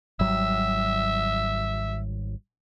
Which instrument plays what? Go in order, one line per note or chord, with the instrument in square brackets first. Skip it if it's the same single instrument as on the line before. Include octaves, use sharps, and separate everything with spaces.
[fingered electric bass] G#1 F#3 G3 [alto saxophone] E5